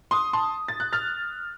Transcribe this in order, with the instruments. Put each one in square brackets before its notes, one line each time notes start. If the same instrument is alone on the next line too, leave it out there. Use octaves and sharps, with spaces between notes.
[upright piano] C6 D#6
A5 C6
A6
F#6
F6 A6